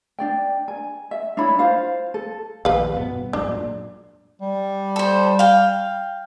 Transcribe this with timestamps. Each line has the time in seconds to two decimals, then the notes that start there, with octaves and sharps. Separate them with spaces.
0.19 D4 D5 G5
0.68 G#5
1.11 E5
1.37 D4 E4 C#5 B5
1.59 F4 C5 F5
2.14 A4
2.65 A#1 D#2 B4 F5
2.95 G2 B2 B3
3.33 A1 F#2 G#3 D4
3.48 A#2 F#3
4.42 G3
4.96 A4 C5
5.39 F5 G5